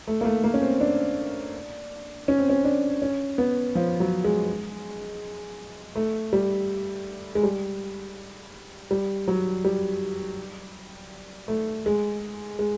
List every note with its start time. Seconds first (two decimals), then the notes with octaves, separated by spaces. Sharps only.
0.07 A3
0.21 A#3
0.25 A3
0.44 A#3
0.54 C#4
0.62 C4
0.80 D4
2.28 C#4
2.39 C4
2.49 C#4
2.64 D4
3.02 C#4
3.38 B3
3.75 F3
4.00 F#3
4.24 G#3
5.96 A3
6.33 G3
7.35 G#3
7.43 G3
8.91 G3
9.28 F#3
9.64 G3
11.48 A3
11.86 G#3
12.59 G#3